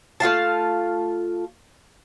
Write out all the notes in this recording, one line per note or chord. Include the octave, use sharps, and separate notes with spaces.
A3 F4 F5 A5